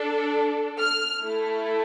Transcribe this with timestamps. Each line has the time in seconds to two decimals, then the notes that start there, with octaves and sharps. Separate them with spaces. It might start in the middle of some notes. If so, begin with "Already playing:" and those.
Already playing: D4 A4
0.78 F6
1.22 A3 E4 A4